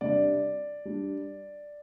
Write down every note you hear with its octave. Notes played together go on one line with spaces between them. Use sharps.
C3 G3 D4 D5
G3 D4